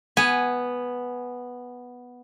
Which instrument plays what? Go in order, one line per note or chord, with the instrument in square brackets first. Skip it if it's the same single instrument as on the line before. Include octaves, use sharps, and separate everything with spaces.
[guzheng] B3 G#5